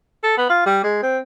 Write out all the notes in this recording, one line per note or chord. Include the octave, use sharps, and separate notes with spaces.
A4
B3
F4
G3
G#3
C4